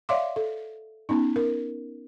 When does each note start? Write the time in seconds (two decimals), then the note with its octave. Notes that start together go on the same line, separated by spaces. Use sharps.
0.09 C#5 D5 E5 F5 C6 D6
0.36 A4
1.09 B3 C#4 D#4
1.36 A#4